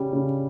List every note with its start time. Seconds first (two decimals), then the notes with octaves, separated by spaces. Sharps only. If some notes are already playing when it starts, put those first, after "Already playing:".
Already playing: C#3 G3
0.13 C#3